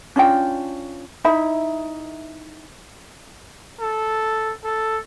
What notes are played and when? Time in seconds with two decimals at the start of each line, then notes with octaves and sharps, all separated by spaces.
0.16 C#4 D4 F4 G5
1.24 D#4 E4 E5 B5
3.80 A4
4.64 A4